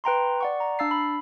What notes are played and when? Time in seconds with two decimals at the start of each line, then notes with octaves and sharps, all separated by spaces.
0.04 B4 G5 A#5 C6
0.41 D5 F#5 C#6
0.60 A#5
0.79 D4 F5 E6 A6 C7
0.91 B5